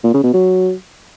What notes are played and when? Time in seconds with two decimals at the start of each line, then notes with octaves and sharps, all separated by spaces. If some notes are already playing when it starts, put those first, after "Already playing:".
0.04 A#2
0.14 C#3
0.24 B2
0.33 F#3